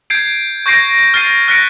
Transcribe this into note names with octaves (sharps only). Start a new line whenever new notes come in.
G6 G#6 C7 D7
C#6 G6 G#6 A#6 C7 D7
F6 A6 C7 D#7
F6 F#6 A#6 B6 C#7 D7